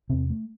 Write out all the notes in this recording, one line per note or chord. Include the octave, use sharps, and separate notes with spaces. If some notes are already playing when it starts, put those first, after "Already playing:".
E2 C3 C4
A3